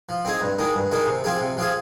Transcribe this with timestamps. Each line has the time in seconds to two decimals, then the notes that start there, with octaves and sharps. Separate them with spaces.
0.09 F3
0.25 C4 D#4 G#4
0.41 G2
0.59 D#3 G#3 D#4
0.75 G2
0.91 D#3 G#3 D#4
1.07 C3
1.24 F3 C4 F4 G#4
1.41 C3
1.57 F3 C4 F4 G#4